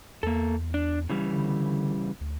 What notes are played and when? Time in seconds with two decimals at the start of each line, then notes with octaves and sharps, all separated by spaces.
0.23 E2 A#3 A4
0.74 D4
1.09 C#3 E3 G3
1.33 D3
2.21 D2